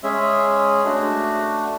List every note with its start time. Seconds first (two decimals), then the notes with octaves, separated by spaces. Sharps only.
0.03 G#3 C#4 G#4 E5
0.85 A3 D4 F#4